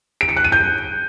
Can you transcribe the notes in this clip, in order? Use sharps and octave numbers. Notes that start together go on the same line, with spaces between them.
D7
C#7
F#6
D#7
G6